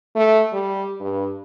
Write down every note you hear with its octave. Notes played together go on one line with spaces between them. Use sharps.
A3
G3
G2